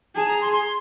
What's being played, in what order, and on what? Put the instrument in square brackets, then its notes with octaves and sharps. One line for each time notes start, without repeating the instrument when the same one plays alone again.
[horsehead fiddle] G#4 [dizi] A5
[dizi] A#5
C6
C6